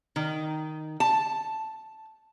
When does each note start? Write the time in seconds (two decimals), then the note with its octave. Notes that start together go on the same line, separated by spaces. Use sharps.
0.16 D#3
1.00 A5